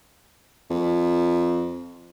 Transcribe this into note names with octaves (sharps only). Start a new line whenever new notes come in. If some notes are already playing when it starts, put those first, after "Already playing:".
F2